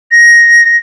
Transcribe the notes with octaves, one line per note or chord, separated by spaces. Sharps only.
A#6